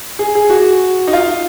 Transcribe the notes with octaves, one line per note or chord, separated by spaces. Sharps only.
G#4
G#4
F#4
D#4
F4